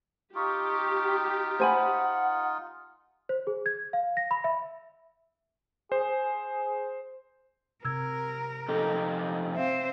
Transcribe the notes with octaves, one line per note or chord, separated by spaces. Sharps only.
D#4 F4 G4 C#6
C5 F#5 G#5 B5
C5
G#4
G#6
F5
A#6
B5
E5
G#4 C5
C3 A#4 E6 G#6
F2 D#4 G4 A4
C4 C5 E5 F5